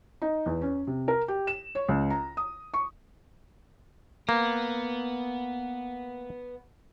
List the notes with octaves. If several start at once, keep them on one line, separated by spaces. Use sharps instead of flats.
D#4
E2
C#4
C3
A#4
G4
E7
C#5
C#2
A#5
D#6
C#6
A#3 B3